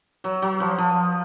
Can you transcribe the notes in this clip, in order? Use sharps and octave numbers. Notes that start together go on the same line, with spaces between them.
F#3
F#3
F3
F3